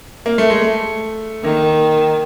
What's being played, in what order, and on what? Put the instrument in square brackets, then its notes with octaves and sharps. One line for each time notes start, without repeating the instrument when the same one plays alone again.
[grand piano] A#3
A3
G#3
A3
[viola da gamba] D#3 [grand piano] A#3